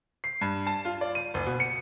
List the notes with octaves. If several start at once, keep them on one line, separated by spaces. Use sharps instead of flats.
C7
G2
A5
F4
D5
D#7
F#1
B2
C#7